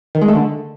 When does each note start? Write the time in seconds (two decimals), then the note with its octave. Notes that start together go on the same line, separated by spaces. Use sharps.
0.15 D#3
0.22 G#3
0.28 A3
0.35 D3